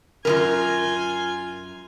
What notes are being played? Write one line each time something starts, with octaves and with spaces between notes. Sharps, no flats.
F#2 D#3 F4 A#4 G#5